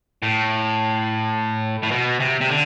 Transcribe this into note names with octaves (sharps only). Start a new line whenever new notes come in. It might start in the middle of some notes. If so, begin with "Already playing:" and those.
A2
A2
B2
C3
C3
D3